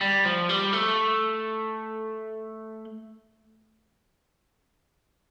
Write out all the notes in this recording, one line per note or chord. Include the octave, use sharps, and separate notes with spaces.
G3
F3
G3
A3